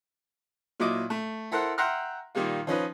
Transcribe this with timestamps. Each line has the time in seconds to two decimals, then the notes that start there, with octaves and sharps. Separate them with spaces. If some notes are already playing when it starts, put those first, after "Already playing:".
0.80 A#2 F#3 E4 D#5 D6
1.10 A3
1.51 E4 A4 A#4 C5 F#5
1.78 E5 F#5 G5 A#5 C6 F6
2.35 A#2 D#3 G3 A#3 F4
2.67 F3 C#4 D#4 B4